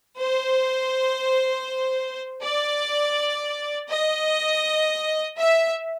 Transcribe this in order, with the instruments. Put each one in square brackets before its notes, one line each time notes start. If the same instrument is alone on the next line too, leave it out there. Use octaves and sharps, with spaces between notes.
[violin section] C5
D5
D#5
E5